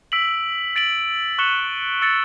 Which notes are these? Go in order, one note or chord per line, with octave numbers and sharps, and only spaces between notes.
E6 B6 D7 F#7
A6 D7 F#7
C#6 F#6 C#7 E7 G7
E6 A6 C#7 G7